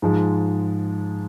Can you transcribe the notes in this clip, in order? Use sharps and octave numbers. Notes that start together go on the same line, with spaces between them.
G#2 F3 G#3